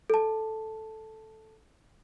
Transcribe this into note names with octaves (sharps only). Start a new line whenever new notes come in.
A4 A5